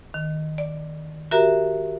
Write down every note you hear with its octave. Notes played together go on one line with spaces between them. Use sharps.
D#3
D5
F#4 G4 A#4 E5 A#5